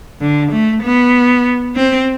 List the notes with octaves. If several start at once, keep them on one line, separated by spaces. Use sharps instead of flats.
D3
A3
B3
C4